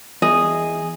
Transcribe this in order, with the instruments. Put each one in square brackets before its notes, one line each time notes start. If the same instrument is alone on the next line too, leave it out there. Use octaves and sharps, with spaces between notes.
[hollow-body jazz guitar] E2 [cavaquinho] G#4 [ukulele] D#5